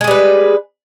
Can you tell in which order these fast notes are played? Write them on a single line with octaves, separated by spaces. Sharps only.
G#3 G#4 G3 B4